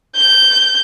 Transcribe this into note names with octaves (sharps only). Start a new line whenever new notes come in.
G6